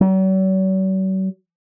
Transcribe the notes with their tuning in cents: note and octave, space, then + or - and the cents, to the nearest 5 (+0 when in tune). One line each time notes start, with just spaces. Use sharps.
F#3 +45